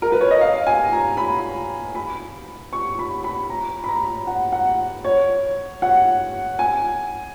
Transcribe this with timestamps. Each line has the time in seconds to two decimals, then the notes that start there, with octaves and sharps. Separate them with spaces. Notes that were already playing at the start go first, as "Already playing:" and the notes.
0.02 A#4
0.12 B4
0.21 C#5
0.31 D#5
0.41 F5
0.67 G#5
0.92 A#5
1.17 B5
1.95 B5
2.73 C#6
2.99 B5
3.24 B5
3.50 A#5
3.84 B5
3.88 A#5
4.27 F#5
4.52 F#5
5.04 C#5
5.82 F#5
6.59 G#5